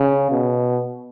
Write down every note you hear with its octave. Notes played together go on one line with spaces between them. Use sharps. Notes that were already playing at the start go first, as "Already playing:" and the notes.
Already playing: C#3
B2